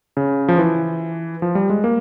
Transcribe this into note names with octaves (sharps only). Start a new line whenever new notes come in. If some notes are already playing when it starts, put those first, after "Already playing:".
C#3
F3
E3
F3
G3
G#3
A#3